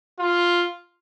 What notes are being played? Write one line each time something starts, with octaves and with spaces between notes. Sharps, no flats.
F4